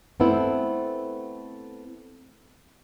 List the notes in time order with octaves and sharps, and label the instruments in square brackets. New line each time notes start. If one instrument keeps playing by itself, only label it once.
[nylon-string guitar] A3 B3 C4 E4